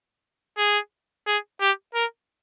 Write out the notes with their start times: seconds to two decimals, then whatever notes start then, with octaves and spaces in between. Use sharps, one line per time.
0.58 G#4
1.27 G#4
1.61 G4
1.95 A#4